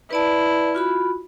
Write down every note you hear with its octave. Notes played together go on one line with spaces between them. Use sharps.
E4 B4 D5 A5
F4 F#4 B5